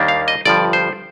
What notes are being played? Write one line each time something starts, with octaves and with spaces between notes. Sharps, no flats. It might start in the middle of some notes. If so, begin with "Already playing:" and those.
Already playing: D#2 D#3 G3 A#3 D4
F5
D#5
G1 G2 F3 D5
C5